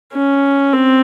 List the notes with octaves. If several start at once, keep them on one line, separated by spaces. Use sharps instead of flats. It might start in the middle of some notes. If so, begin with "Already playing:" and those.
C#4
C4